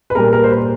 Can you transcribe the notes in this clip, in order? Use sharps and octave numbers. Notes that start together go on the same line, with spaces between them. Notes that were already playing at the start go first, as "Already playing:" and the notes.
B4
A#2 G3 A#4
A#4
C5
B4